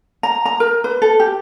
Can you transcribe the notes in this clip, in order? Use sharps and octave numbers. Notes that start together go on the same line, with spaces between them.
A#5
A#5
A#4
B4
A4
G4